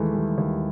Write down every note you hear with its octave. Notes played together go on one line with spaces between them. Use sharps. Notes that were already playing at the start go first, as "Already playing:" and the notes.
Already playing: D#2 E3 G#3 A3
E3 G3
D#2